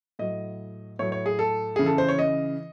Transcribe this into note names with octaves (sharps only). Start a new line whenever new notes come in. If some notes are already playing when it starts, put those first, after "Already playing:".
A2 F#3 D#5
A2 F#3 C#5
C#5
G#4
A4
C#3 E3 G#4
A4
C5
C#5
D#5